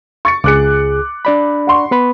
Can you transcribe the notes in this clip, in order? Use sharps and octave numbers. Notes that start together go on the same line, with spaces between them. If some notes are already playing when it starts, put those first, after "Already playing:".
C#6 A6 C#7
C#2 G#4 D6 F#6 C#7
D4 D5 B5
F#5 C6 C#6
B3 B4 B5